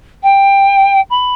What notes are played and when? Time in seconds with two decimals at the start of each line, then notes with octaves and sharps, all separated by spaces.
0.23 G5
1.10 B5